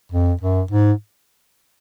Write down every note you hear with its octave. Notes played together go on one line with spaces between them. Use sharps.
F2
F#2
G#2